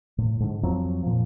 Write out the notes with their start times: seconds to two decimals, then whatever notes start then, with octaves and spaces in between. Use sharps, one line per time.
0.18 A2
0.40 G#2 D3
0.63 F2 F3 F#3 C4
1.03 A#2 F3